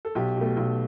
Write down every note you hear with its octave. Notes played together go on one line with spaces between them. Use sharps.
A4
B1 G4
B2 A3
B1